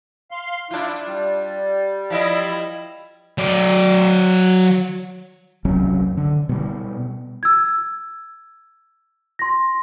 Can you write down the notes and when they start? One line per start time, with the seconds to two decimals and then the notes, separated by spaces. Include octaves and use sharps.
0.31 F5 C6
0.71 D4 E4 F4
1.06 G3
2.10 F3 E4 D#5
3.38 F#3 D5
5.65 F#1 C2 F#3 C#4
6.17 D3
6.49 B2 G3
7.43 E6 G#6
9.39 C6 A#6